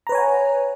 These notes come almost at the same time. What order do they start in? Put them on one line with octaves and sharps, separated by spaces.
A#5 B4 C#5 G#5 F#5